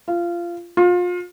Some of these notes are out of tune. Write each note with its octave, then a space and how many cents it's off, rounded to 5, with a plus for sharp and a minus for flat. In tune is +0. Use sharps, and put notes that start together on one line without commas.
F4 -20
F4 +30